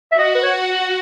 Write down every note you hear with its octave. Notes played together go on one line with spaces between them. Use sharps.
E5
F#4 D#5
B4
C#5